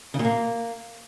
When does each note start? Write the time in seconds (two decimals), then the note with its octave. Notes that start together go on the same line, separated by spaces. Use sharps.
0.14 C#3
0.19 A#2
0.25 A#3